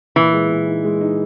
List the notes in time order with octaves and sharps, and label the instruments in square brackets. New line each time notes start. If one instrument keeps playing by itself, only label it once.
[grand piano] A#2 [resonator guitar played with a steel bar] E3
[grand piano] G#3
A#2
D#4
G#3
D#4